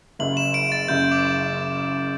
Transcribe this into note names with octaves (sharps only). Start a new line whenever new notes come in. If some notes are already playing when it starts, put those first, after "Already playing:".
F#1 F#2 C#3 F#7
E7
D7
A6
F#1 F#2 C#3 G6
D6